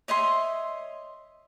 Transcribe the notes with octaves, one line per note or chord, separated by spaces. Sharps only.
C#5 D#5 E5 C6